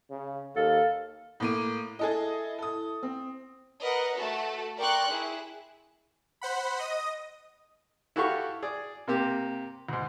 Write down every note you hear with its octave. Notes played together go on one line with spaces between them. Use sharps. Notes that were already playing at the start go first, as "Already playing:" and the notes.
C#3
D#2 A4 F5
A2 A#3 D#7
E4 G#4 A4 D#5
A4 D#6
C4
A#4 B4 D#5 F#5 A#5
A3 F#4 A4
A#4 D5 G5 C6 C#6 F#6
E4 G#4
C5 F#5 B5
D#5 D#6
E4 F#4 G4 A4 F5 C#6
G#4 D5
C3 A#3 G4
D2 G#2